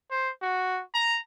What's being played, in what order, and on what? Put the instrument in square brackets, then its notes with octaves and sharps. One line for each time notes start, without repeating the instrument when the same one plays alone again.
[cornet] C5
F#4
A#5